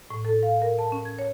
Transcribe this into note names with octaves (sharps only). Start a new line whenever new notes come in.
A2
A4
F5
A#4
A5
C#4
G#6
C#5